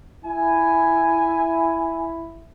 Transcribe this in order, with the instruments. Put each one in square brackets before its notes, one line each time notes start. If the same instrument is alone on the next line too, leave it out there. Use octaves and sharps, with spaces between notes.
[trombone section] E4 [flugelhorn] G#5